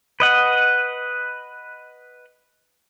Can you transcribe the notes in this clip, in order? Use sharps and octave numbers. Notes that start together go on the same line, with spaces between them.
B4 D#5 F#5